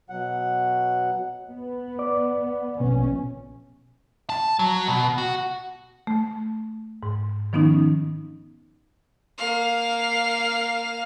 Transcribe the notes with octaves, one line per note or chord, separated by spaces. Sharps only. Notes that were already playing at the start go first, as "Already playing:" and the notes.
B2 F#3 F#5
B3
D5 D6
A#1 B2 B3 C#4
A5
F#3
B2
F#4
A3
G#2
D#3 F3 B3 C#4 D#4
A#3 F5